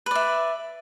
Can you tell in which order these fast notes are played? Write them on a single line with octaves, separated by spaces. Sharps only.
B4 D5 E5